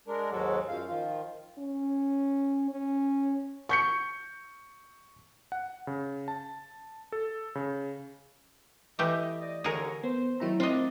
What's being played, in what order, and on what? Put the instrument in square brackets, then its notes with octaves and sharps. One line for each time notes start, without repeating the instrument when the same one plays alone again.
[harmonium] G#3 D4 A#4
D#2 G#2 F#3 G#3 F#4 A4
F#2 F3 F5
D#3 F3 F4
[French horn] C#4
C#4
[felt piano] C#6 G6 C#7
[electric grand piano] F#5
C#3
A5
A4
C#3
[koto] E3 A3 G4 [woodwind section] D#5
[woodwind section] D5 D#5
[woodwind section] D#2 D3 C#5 [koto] G#4 A#4
[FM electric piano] B3 [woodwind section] C5
[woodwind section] D#3 A3 [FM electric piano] F#3 E4 A#5
[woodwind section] D#3 A3 D4 [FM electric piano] C4 [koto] F4 D#5